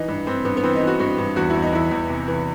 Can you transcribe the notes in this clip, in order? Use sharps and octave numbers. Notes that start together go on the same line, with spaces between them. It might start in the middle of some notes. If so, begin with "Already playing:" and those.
Already playing: E3 D#4
G2
G2 C4
G2 B3
B3
E3 C4
D#4
E3
F#4
G2 F#4
G2
E2 F#4
E2 E4
D#4
E2 E4
E2
C3
E3